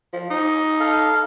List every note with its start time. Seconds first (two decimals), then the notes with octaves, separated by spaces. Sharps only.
0.13 F3
0.30 D#4
0.80 A4 F5